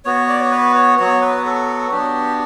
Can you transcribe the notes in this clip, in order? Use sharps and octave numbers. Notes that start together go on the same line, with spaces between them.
B3 F#4 C#5
D5
C#5
B4
C#5
F#3 B3 F#4 C#5
B4
A4
B3 D4 F#4 G4